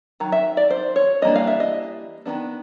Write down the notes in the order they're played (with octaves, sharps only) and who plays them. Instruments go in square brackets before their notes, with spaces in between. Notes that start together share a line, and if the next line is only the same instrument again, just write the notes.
[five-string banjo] D#3 F#3
E5
D5
C5
C#5
E3 G3 A#3 D4 D#5
F5
E5
D#5
D#3 F#3 B3 D4